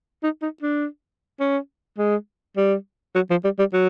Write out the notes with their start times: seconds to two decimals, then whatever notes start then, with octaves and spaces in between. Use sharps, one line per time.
0.23 D#4
0.42 D#4
0.62 D4
1.40 C#4
1.98 G#3
2.57 G3
3.15 F#3
3.31 F3
3.44 G3
3.59 G3
3.74 F#3